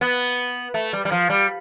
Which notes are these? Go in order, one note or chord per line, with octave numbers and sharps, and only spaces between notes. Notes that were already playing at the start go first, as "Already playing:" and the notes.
B3
A3
G3
G3
F3
G3